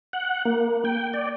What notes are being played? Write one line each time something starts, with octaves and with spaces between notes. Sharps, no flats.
F#5
A#3
G5
D5